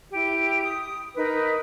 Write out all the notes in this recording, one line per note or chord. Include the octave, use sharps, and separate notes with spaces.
E4 G4
D#6
D#4 A#4 B4